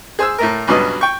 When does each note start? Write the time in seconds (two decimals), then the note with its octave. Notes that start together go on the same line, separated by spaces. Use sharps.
0.19 G#4 C5 G#5 E6
0.38 A2 A3 A#4
0.67 C#2 G2 B2 F#3 B3 D#5
1.01 G5 C#6